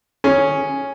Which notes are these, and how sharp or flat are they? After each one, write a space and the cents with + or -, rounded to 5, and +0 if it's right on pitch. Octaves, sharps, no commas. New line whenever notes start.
C#4 +0 G#4 +5